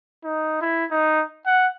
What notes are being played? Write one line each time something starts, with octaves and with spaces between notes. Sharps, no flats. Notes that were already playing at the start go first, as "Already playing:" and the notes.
D#4
E4
D#4
F#5